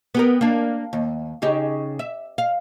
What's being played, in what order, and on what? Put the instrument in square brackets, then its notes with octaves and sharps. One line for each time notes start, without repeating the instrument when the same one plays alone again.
[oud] B3 G4 A#4
A#3 D4
D#2
C#3 D#4 G4
E5
F5